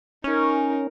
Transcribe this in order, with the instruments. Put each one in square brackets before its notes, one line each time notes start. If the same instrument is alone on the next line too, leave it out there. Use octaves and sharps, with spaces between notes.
[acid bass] C#4 [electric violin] D#4 A#4